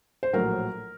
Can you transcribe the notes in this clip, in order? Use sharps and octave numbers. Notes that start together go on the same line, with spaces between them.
C5
A#1 A2 F#3 A#4